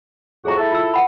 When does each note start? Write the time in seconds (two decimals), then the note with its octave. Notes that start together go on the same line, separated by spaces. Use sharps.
0.45 F2 A2 F#4 G#4 A#5
0.58 E4 A4
0.71 F4 E6
0.94 F#5 B5